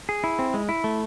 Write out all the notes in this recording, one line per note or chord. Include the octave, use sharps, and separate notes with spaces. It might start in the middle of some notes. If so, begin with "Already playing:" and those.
G#4
E4
C4
G#3
E4
A3